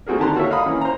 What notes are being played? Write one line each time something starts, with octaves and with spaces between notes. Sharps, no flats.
A3 C4 F#4 G#4 A#4
D3 D#3 G4 A5 A#5 C6
A#3 F#4 A4 A#4 C#5 E5
D#5 F5 F#5 A#5 B5 D#6
E3 A#3 C#4
C5 A#5